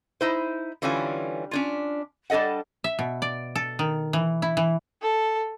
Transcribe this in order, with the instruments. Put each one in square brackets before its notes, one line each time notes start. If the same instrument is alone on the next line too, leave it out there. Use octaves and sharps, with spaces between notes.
[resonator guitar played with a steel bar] D#4 E4 C5
D3 E3 G3 C#4 F4 G#5
C#4 D4 F4
G3 D4 A4 D#5 F#5
[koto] E5
B2
D5
A4
D#3
E3
E4
E3
[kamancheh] A4